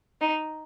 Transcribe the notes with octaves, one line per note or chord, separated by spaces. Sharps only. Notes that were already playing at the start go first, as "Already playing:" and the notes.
D#4